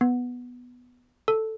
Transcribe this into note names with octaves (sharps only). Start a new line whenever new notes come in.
B3
A4